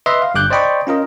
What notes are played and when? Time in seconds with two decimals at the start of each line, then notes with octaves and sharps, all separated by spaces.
0.06 B4 D#5 E5 C6
0.22 F5
0.34 G1 G2 D6 F#6 G6
0.50 C5 D5 D#5 G5 B5 C#6
0.87 C#4 F4 A#4 D#5